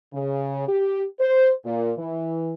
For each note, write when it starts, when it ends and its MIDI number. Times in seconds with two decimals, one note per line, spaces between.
0.14 0.69 49
0.69 1.04 67
1.20 1.51 72
1.65 1.91 46
1.98 2.54 52